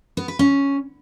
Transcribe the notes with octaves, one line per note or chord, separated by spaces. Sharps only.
B3
B4
C#4